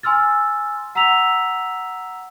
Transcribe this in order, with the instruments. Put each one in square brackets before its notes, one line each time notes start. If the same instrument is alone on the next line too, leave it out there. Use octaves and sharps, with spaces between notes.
[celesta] G#5 C6 E6 F6 A6
F#5 A#5 E6 B6 F7